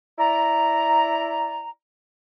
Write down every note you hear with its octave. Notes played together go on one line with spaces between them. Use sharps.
E4 D5 A#5